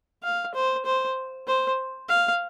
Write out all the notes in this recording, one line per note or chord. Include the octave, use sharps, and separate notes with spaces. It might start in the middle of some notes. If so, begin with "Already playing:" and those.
F5
C5
C5
C5
F5